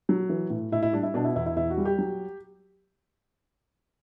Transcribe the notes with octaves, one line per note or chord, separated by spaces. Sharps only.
F#3
E3
A2
A2 E4
E4
G3 D4
E4
B2 D4
E4
E2 E4
E4
E2 E4
F#4
G3
G4
F#3